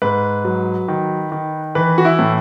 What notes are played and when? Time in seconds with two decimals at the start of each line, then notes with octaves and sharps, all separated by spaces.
0.02 G#2 B4
0.45 F#3
0.88 D#3
1.32 D#3
1.75 E3 B4
1.98 F#4
2.05 E4
2.19 A2